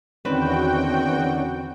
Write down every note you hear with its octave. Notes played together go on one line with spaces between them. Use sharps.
E2 D3 D#3 C4 C#4 F#4 B4 G5